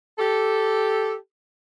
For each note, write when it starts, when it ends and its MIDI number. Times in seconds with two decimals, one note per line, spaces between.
0.18 1.14 67
0.18 1.14 69